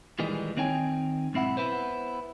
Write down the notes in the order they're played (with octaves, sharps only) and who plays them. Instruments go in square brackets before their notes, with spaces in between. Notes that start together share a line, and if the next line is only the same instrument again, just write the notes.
[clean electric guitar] A#2 D#3 E3 G3 G#3
D#3 C4 D#4 C#5 G5 G#5
B1 G#2 C4 E4 F#5
B3 E4 B4 C5